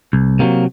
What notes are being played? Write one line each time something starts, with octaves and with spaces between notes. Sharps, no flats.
C2
C3 D#3 F#3 A#3